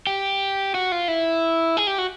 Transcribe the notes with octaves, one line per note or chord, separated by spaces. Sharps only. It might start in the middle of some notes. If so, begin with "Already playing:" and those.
G4
F#4
F4
E4
G#4
G4
F#4